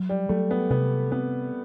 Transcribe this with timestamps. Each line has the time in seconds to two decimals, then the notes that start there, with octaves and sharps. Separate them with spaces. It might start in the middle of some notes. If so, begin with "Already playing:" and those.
Already playing: F#3
0.09 G3
0.29 F#3 A3
0.51 B3
0.70 C3 B3
1.12 B3 C4